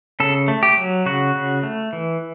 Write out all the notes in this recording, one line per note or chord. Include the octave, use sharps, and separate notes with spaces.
C#3 A4
A3
G4
F#3
C#3 F#4
C#3
A3
E3